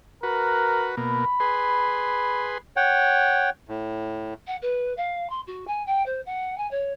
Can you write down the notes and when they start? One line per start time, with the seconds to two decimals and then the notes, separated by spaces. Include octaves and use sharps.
0.23 F#4 A#4 B4
0.97 B2 A#3 B5
1.40 G#4 B4 C6
2.76 C#5 F#5 G5
3.69 A2
4.47 F#5
4.62 B4
4.97 F5
5.29 C6
5.47 F#4
5.67 G#5
5.86 G5
6.06 C5
6.26 F#5
6.58 G#5
6.71 C#5